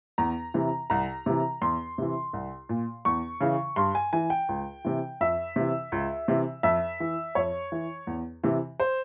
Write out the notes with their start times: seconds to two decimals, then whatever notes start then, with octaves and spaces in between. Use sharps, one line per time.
0.18 E2 A#5
0.54 C3 E3
0.90 C2 A#5
1.26 C3 E3
1.62 E2 C6
1.98 C3 E3
2.33 C2
2.69 A#2
3.05 E2 C#6
3.41 C#3 E3
3.76 G2 C6
3.95 G#5
4.13 E3 G#5
4.30 G5
4.49 C#2
4.85 C3 E3
5.21 F2 E5
5.56 C3 E3
5.92 C#2
6.28 C3 E3
6.63 F2 E5
7.00 E3
7.35 F2 C#5
7.72 E3
8.07 E2
8.44 C3 E3
8.80 C5